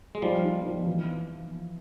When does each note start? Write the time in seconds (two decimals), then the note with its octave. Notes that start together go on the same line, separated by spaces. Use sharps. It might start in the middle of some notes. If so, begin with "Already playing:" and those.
0.15 G#3
0.22 F3 G3 D#4
0.44 D#4
0.65 F3
0.86 E3